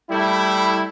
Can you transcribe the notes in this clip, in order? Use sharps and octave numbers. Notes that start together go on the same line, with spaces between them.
G3 A3 E4